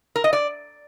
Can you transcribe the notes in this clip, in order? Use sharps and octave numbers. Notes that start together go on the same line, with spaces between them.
A#4
D#5
D5